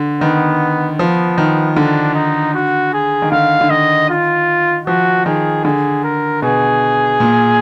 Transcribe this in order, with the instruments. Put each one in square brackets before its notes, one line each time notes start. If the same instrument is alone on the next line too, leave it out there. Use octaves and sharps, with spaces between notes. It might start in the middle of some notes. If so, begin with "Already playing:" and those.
Already playing: [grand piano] D3
[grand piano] D#3 [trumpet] B3
[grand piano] F3 [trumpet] B3
[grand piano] D#3
[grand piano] D3 [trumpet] D4
[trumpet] D#4
F#4
G#4
[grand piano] D#3
[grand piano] D3 [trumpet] F5
[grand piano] D3
[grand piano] D#3 [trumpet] D#5
[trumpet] F4
[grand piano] F3 [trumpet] F#4
[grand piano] D#3 [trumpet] G#4
[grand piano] D3 [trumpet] G#4
[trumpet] A#4
[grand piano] B2 [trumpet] G#4
[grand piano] A#2